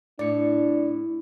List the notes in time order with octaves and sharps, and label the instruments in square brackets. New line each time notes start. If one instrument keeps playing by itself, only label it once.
[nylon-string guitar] A2 [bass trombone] D4 [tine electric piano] D5 C#7